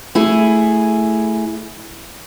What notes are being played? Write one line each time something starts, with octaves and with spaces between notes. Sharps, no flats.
A3 E4 G#4